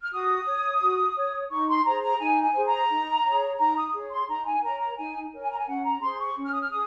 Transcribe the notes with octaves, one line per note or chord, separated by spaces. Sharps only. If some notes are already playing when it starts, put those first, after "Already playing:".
F6
F#4 D#6
C#5
F#4
C#5
D#4 C#6
C6
G#4 C5 A#5
A#5
D#4 G#5
G#5
G#4 C5
A#5
D#4
G#4 C#5
D#4 A#5
D#6
G#4 C#5
C6
D#4 A#5
G#5
A#4 C#5 A#5
A#5
D#4 G#5
A#4 C#5
G#5
A#5
G#5
C#4 F#5
A#5
G#4 C5 C6
C#6
C#4
F6
D#6
F6
G#4 D#6